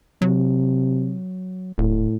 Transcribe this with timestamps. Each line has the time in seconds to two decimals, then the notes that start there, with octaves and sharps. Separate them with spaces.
0.22 C3 F#3
1.78 D#1 A2